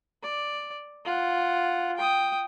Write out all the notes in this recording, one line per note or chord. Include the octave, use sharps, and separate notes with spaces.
D5
F4 F#5
G5 D#6